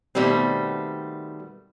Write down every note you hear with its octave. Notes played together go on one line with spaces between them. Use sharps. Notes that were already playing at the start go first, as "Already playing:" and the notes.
B2 D#3 G3 A3 B3 C4